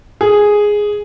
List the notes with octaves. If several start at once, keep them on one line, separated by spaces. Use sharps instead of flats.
G#4